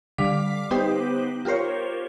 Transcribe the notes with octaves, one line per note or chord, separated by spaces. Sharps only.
D3 G3 F5 D6 B6
B3 D#4 G4 B4 C5
F4 G4 A#4 C5 C#5